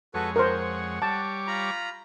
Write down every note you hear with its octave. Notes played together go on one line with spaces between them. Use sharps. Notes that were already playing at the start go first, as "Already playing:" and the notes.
F2 G#3 F#4 A4 B4 C#5
A#4 C5 F#5
G3 C#5 A5 D6
F4 A#5 B5